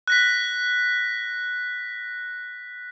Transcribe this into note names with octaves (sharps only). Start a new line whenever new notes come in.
F#6 A#6 B6